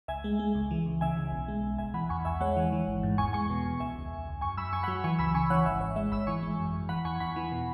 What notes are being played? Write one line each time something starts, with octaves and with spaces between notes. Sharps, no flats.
C#2 E5 G#5
G#3
G#3
C#2
E3
C#2
C#3 E5 G#5
C#3
B1
G#3
B1
B1 E5 G#5
E3 F#5 B5
E2 G#5 C#6
E2 E5 G#5
G#3 C#5 F#5
E3
E3
G#1
G#2
E2 G#5 C#6
G#3 G#5 C#6
B2
E2
C#2 E5 G#5
C#2
C#2
C#2
F#2 G#5 C#6
F#2 B5 E6
F#2 G#5 C#6
F#5 B5
F#3
E3 G#5 C#6
C#2 B5 E6
C#3 G#5 C#6
E3 C#5 F#5
G#1 E5
G#1 C#5
G#3 E5
G#1 B5 E6
E3 G#5 C#6
G#3
F#2
F#2
E3 F#5 B5
E2 G#5 C#6
E2 F#5 B5
E3
B2